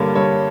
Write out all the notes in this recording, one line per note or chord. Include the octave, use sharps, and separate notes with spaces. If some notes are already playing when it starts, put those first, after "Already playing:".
Already playing: G2 D3 G3 A#3 C#5
G2 C#5